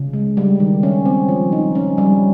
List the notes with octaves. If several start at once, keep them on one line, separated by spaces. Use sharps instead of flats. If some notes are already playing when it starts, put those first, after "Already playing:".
Already playing: C#3
G#3
G3
D#3
C#4
C4
F3
D#4
C#4
G3